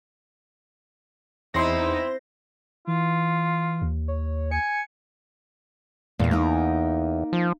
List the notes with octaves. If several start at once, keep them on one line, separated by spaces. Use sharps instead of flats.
E2 C4 D#4 E4 C6 A#6
E3 F4
D#2
C#5
G#5 C#7
E2 A#2 F5
A#3 D#4
F3